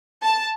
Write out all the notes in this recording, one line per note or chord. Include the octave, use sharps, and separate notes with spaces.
A5